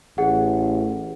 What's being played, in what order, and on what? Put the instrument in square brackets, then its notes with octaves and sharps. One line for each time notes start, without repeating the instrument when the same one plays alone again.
[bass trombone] A1 [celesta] G#4 F#5